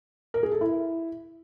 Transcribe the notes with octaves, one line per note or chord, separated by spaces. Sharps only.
A#4
G#4
A4
E4